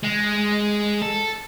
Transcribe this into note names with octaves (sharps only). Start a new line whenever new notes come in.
G#3
A4